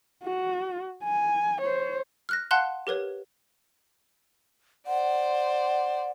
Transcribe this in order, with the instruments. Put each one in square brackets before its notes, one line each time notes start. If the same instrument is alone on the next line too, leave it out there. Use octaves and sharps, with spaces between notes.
[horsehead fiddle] F#4
G#5
C5 C#5
[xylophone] F6 F#6 A#6
F5 F#5 A5 C6 F#6
G4 A#4 B4 C#5
[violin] C5 D5 [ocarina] F#5